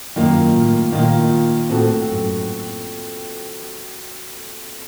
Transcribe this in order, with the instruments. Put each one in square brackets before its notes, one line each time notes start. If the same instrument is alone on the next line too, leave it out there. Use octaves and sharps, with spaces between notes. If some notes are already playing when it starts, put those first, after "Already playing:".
[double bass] F#2 [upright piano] D#3 A#3 F4
[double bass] A2
[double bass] A#2 [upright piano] D#3 A#3 F4
[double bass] A2 [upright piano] C4 F#4 A4
[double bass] F#2